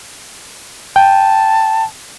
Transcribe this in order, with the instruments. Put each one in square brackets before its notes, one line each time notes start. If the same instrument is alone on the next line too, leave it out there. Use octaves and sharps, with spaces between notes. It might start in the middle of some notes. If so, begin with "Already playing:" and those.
[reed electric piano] G5 [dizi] A5